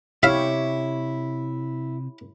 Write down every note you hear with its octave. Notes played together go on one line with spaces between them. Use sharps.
C3 E4 G4 C#5 E5 F5